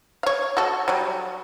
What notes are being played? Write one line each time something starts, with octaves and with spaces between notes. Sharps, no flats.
C#5 F5
F#4 A4
F#3 G3